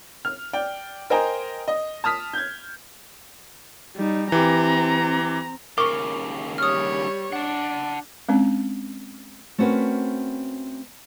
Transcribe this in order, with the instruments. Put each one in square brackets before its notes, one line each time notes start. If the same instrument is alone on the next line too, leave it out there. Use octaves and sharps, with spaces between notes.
[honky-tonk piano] F6
D5 G5
A#4 C5 D#5 G5 G#5 A#5
D#5
A5 D#6 F6 B6
G6 G#6
[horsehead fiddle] G3 D#4
[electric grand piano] E3 G4 [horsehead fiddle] C4 A#5
[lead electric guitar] D#2 C#3 [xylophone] A#4 [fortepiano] C#6 D6
[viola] G3 C#5 [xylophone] D#6 F6
[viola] D4 [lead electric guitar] F#5 A5
[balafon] G#3 C4 C#4
[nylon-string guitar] A3 C4 C#4 F#4 A#4 B4